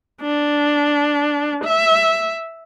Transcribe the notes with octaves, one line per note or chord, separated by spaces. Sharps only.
D4
E5